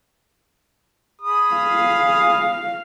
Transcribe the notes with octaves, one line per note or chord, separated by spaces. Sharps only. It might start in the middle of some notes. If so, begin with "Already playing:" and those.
G#4 B5 D#6
F5